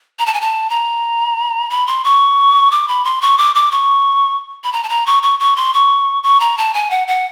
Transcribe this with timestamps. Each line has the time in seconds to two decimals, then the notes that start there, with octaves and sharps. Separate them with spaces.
0.19 A#5
0.26 A5
0.34 G#5
0.41 A5
0.70 A#5
1.70 B5
1.87 C6
2.04 C#6
2.71 D6
2.88 B5
3.05 C6
3.22 C#6
3.38 D6
3.55 D6
3.72 C#6
4.64 B5
4.73 A#5
4.83 A5
4.89 A#5
5.06 C#6
5.23 C#6
5.40 C#6
5.56 C6
5.74 C#6
6.23 C#6
6.40 A#5
6.58 A5
6.74 G#5
6.91 F#5
7.08 F#5